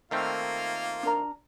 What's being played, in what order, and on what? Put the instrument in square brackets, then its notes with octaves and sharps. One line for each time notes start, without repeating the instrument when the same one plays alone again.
[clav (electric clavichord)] D#3 A3 C4 [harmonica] A#3 F4
[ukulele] D4 A#4 A#5